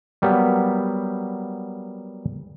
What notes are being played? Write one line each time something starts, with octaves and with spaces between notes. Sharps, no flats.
F#3 G3 A#3 B3